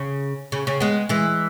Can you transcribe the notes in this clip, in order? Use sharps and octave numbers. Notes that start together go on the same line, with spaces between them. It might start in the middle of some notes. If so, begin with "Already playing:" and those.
Already playing: C#3
C#3
C#3
G#3 B3
E3 G#3